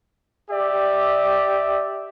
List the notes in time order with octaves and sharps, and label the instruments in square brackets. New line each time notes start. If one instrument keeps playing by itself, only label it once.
[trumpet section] G4 D5 E5